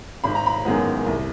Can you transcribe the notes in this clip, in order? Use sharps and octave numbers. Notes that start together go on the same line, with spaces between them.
G#1 B5
A#5
B5
F#2 D#3 G#3 B3
C2